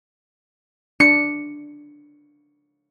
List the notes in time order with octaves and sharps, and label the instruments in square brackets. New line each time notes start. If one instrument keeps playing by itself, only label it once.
[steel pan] D4 [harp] C#7